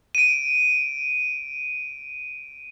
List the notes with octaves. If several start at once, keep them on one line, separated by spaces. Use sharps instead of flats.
D7 D#7